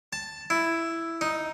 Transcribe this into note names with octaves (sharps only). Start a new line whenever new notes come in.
A5
E4
D#4